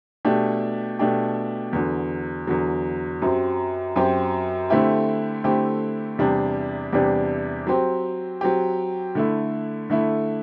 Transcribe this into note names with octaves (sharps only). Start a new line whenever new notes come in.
B2 A3 D4 G4
B2 A3 D4 G4
E2 D3 F#3
E2 D3 F#3
F#2 F#3 C4 G4
F#2 F#3 C4 G4
D3 A3 C4 E4 G4
D3 A3 C4 E4 G4
E2 C3 G3 D4 G4
E2 C3 G3 D4 G4
F#3 C4 G4
F#3 C4 G4
D3 A3 E4
D3 A3 E4